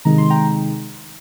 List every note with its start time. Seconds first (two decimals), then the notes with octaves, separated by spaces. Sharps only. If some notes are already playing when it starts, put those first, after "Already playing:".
0.05 C3 D#3 G#3 D#4 A#5
0.18 C6
0.30 G5 A#5